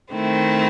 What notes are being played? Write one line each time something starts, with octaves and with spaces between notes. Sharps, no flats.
D#3 A3 C4 E4